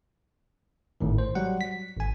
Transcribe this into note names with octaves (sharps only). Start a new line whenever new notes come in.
G#1 A2 D#3
C5
F#3 G3 F#5
B6
G#1 G#5